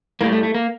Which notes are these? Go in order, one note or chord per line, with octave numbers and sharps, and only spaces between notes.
A2 G3 A#3
A3
A3
A#3